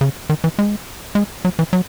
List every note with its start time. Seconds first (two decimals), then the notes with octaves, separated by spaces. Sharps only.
0.01 C#3
0.29 D#3
0.44 E3
0.59 G#3
1.15 G#3
1.45 F#3
1.59 E3
1.73 F#3